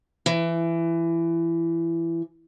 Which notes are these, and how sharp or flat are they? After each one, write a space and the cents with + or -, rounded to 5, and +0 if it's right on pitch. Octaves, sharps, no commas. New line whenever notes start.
E3 +20